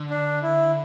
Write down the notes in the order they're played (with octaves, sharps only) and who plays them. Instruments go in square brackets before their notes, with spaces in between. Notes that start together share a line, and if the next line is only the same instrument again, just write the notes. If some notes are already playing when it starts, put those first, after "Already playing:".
Already playing: [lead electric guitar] D3
[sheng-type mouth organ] D4
E4